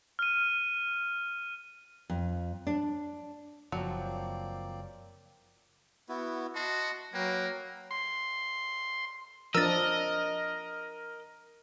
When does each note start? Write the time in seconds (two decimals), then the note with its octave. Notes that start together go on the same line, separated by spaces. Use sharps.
0.19 F6 D#7
2.10 F2
2.67 D4
3.72 F#1 F3 F#3 A#3 C4 D5
6.09 B3 E4 F#4
6.55 F#4 D#5 A5 C6
7.14 F#3 A#3 B4 G5
7.91 C6
9.55 F3 D4 A#4 D#5 E6 A6